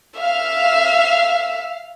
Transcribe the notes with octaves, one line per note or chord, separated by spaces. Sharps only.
E5 F5